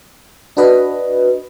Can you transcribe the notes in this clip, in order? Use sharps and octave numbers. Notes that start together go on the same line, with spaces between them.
D4 F#4 B4 D#5